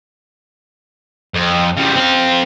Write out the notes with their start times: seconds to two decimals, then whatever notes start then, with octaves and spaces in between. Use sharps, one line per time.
1.34 F2
1.77 C#3 G3
1.96 C4 F5